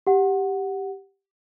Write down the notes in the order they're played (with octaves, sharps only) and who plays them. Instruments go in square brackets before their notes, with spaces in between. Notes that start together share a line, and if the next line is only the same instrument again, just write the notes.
[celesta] G4 F#5